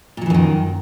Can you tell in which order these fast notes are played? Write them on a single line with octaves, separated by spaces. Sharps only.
A#2 F#3 E3 F#2 D#3